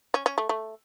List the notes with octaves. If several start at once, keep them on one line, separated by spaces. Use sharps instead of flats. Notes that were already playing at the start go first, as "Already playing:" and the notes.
C#4
C#4
A3
A3